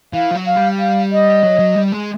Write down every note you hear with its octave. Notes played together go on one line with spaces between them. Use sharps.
E3 F5
F3
F#3
F5
G3
F5
D#5
F#3
F#3
G3
G#3